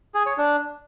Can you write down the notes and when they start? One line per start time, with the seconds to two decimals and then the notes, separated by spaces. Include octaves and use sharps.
0.14 G#4
0.26 C#5
0.38 D4